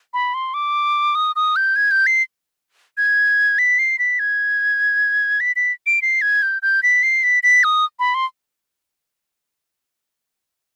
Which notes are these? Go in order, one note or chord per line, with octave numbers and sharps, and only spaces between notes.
B5
C6
D6
D#6
D#6
G6
G#6
G6
C7
G#6
B6
C7
B6
G#6
B6
B6
D7
C7
G#6
G6
G6
B6
C7
B6
B6
D#6
B5
C6